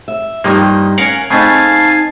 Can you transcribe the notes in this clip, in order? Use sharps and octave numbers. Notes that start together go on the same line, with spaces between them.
E5
G2 D#3 F3 G3 A#3 D#4
C#4 A#4 F5 F#5 G#5
C#3 A3 C4 D#4 F5 G#5 A5